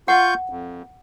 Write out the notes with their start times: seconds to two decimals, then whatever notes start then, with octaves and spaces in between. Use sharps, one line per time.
0.08 F4 F#5 C#6 G6
0.50 F2